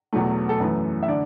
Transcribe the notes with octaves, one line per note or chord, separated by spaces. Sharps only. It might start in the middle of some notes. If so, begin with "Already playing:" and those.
E2 B2 F#3 A3
A4
F#2 E3 A3 B4
E5
D3 D5